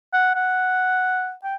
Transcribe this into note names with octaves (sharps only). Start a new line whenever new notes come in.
F#5
F#5
G5